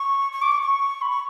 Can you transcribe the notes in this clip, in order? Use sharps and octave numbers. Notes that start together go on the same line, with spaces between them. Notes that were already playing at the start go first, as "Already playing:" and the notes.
Already playing: C#6
C#6
D6
C#6
C#6
B5
C#6